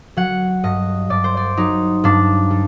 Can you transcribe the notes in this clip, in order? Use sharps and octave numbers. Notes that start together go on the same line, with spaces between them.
F#3 F#5
G2 D#5
G2 D5
C5
D5
F#3 D#4
G2 D4
G3